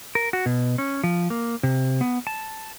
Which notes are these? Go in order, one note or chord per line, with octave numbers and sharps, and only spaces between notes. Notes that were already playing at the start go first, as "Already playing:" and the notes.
A#4
F#4
B2
C#4
F3
A#3
C3
B3
A5